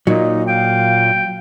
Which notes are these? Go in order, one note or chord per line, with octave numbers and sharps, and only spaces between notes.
A#2 F#3 D#4
F5 G5